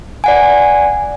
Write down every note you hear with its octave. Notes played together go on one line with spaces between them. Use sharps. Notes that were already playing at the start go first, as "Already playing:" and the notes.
D5 F#5 G#5